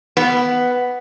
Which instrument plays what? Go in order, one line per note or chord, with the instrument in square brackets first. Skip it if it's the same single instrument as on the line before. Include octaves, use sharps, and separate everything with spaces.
[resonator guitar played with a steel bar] B3